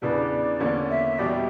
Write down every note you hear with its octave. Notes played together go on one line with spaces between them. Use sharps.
E2 C#3 E3 B3 D4 D5
E2 D3 A#3 C#4
E5
E2 B2 G3 D5